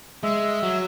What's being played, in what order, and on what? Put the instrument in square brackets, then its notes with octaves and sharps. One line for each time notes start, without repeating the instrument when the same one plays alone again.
[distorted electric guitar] G#3 [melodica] E5
[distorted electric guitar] F#3